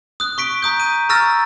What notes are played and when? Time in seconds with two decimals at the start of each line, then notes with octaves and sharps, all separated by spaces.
0.20 D#6 F#6
0.38 C#6 B6 D7 G7
0.63 A#5 D#6 G6
0.80 D#7
1.09 A#5 C#6 E6 F6 A6 A#6